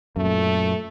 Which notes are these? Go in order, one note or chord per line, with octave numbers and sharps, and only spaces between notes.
F#2 A#2 A3